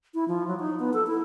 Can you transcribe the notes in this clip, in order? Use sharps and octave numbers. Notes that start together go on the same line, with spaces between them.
E4
F3
F#3
D#4
B3
A4
E4